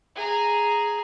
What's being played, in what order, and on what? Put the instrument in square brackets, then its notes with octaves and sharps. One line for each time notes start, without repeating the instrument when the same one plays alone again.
[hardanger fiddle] G#4 A#5